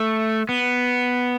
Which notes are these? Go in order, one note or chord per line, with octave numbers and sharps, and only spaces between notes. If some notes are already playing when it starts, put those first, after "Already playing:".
Already playing: A3
B3